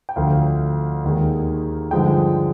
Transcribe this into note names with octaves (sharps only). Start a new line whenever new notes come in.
G5
D2 D3 F3 F5
D#2 D#3 G#3
G2 D3 F3 G#3 G5